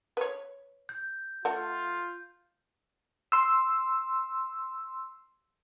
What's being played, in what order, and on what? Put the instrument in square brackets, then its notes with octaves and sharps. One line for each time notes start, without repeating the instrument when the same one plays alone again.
[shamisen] B4 C#5
[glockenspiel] G6
[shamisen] A3 F#5 [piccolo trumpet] F4
[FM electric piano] C6 E6